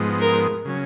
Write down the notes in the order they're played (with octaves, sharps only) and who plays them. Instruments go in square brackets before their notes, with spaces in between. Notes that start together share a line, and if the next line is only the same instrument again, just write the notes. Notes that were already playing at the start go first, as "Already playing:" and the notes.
Already playing: [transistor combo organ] G#2 F3 G#3 B3
[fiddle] A#4
[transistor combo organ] C#3 F#3 C#4